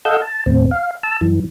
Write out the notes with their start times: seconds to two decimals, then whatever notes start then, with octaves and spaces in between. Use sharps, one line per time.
0.05 A4 D#5 F5 F#5 E6 G6
0.22 A5
0.46 D#2 A2 C4
0.71 F5
1.03 A5 E6
1.21 F#2 E3